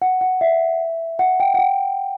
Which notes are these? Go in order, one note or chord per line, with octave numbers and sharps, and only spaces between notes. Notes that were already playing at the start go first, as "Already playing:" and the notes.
F#5
F#5
E5
F#5
G5
F#5
G5